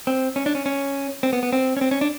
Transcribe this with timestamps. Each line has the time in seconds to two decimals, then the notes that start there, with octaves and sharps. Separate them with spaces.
0.07 C4
0.36 C#4
0.46 D4
0.55 C#4
0.66 C#4
1.23 C4
1.33 B3
1.43 B3
1.53 C4
1.77 C#4
1.81 C4
1.91 C#4
2.01 D4